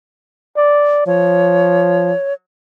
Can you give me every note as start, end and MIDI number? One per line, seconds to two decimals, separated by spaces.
0.57 1.03 74
1.07 2.13 53
1.07 2.34 73